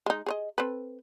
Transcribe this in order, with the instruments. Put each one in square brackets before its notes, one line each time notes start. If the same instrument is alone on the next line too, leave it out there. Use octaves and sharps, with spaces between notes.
[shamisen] G#3 D#4
G#4 C#5 D#5
C4 A4 B4